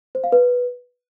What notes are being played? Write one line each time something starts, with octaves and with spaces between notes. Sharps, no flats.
C5
F5
B4